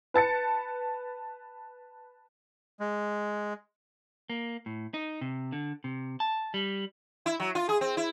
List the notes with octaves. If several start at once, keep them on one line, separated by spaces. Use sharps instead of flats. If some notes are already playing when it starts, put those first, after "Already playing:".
B4 A5 A6 C#7
G#3
A#3
A2
D#4
C3
D3
C3
A5
G3
E4
F#3
F4
G#4
C4
E4